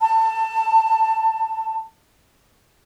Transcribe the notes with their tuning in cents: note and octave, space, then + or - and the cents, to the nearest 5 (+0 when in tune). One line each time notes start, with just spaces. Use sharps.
A5 +20